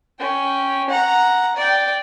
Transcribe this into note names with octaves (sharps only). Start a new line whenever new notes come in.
C#4 G5
F#5 A#5
D5 G5